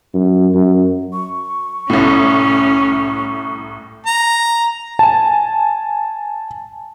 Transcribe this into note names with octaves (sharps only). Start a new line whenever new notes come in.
F#2
F#2
C#6
C2 A2 C#4
A#5
G#5 A5